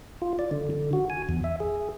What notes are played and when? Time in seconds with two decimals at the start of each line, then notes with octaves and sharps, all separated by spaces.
0.22 F4
0.39 D5
0.51 D3
0.70 D3
0.93 F#4
1.10 G#5
1.29 E2
1.44 E5
1.60 G#4